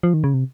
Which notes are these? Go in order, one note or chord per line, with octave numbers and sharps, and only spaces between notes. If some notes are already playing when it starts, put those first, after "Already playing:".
F3
D#3
C#3
C3